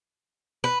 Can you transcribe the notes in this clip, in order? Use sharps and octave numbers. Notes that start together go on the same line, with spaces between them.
B4